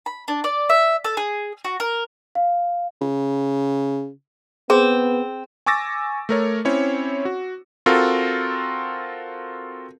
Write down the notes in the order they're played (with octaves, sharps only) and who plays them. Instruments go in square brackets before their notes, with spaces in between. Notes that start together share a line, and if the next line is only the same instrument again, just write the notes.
[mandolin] B5
D4
D5
E5
A4
G#4
F#4
A#4
[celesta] F5
[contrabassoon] C#3
[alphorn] B3 [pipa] C4 [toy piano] G#4
[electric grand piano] G#5 C#6 D6 E6 A6 A#6
A3 A#4 C#5
C4 C#4 E4 C5 C#5
F#4
C4 F4 F#4 A4 A#4